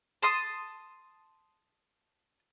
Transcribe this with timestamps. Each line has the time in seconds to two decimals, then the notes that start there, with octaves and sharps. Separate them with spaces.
0.22 A5 C6 D#6